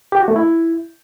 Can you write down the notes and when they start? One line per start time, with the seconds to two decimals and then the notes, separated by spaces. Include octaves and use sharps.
0.12 G4
0.20 F#4
0.28 A3
0.36 E4